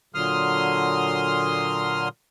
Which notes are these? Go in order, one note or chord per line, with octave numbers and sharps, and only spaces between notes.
A#2 D3 F#3 C6 D#6 F6